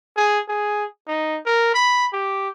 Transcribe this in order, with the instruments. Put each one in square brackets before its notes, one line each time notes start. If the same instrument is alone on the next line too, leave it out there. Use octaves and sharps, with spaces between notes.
[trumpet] G#4
G#4
D#4
A#4
B5
G4